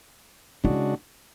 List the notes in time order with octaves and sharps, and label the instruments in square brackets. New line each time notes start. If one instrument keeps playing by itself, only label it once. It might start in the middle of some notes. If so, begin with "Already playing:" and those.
[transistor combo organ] C#3 G#3 D4 F#4 [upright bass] E4